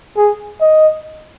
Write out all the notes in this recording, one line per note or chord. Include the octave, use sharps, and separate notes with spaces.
G#4
D#5